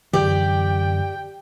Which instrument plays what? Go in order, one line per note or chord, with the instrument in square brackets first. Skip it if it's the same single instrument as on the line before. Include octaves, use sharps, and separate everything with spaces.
[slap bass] F#2 D3 E3 [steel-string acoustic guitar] G4 D5 [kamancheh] G5